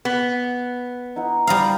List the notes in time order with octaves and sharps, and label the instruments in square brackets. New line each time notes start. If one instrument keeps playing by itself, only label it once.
[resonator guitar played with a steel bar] B3
[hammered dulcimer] D#4 E4 F#5
[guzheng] G3 D#5 F5